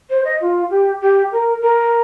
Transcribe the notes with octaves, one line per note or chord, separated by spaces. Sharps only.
C5
D#5
F4
G4
G4
A#4
A#4